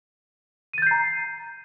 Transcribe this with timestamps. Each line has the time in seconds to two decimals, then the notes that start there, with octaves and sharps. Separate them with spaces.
0.73 D#7
0.78 A6
0.82 G6
0.87 C7
0.91 A#5